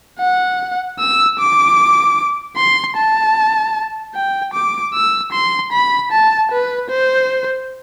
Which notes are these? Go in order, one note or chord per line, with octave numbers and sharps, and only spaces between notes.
F#5
E6
D6
C6
A5
G5
D6
E6
C6
B5
A5
B4
C5